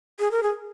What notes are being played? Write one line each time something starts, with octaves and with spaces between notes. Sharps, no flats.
G#4
A#4
G#4